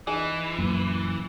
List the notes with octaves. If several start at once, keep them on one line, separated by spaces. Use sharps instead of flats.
E3 D#4 G#4 G#5
F#2 A#2